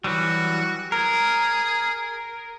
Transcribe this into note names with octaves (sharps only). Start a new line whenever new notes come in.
E3 F#3 G3 F#4
G#4 A#4